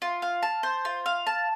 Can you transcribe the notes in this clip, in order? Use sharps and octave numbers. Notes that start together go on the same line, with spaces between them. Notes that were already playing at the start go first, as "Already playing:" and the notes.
F4
F5
A5
C5
F4
F5
A5